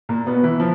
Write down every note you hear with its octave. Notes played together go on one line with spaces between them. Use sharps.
A#2 A#3
B2 B3
E3 E4
F3